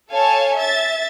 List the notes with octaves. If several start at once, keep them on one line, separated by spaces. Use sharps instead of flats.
A4 C#5 F5 G#5 A5
E5 A6